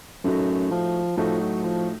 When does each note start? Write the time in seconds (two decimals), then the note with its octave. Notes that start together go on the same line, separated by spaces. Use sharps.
0.24 F#2 A2 A3 D#4 F#4
0.71 F3
1.17 A2 F3 A3 D#4 F#4
1.40 F#3
1.64 F3